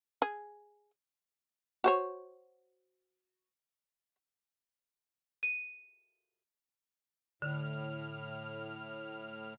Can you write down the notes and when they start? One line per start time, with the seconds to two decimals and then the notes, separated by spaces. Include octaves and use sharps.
0.22 G#4
1.84 F#4 C5 C#5
5.43 D#7
7.42 A2 D3 F6